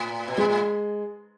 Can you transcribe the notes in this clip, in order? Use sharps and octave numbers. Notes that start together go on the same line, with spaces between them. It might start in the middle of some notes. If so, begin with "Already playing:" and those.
Already playing: A2
B2
A2 G#3
A2